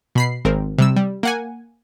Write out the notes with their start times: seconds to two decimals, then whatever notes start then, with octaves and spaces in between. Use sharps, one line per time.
0.15 B2 B5 C7
0.45 G#1 C4 A#4
0.78 C3 G3 E6
0.96 G3
1.23 A#3 F#5 G#5